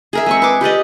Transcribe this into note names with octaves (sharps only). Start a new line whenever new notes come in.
G#4 A#4 E5
G#3 C4 C#6
B4 D6
G4 B4 D5 D#5